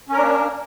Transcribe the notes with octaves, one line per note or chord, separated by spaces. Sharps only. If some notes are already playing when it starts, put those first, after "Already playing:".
A#3 C#4 D4 A#4